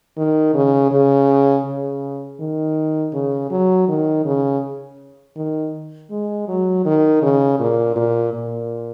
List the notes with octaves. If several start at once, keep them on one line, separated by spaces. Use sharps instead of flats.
D#3
C#3
C#3
C#3
D#3
C#3
F#3
D#3
C#3
D#3
G#3
F#3
D#3
C#3
A#2
A#2
A#2